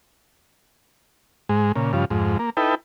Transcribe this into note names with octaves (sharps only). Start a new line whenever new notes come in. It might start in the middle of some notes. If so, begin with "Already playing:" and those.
G#2 G#3
A#2 C#3
G2 C#3 F3
F2 G#2
A#3
D#4 E4 A4 B4 G5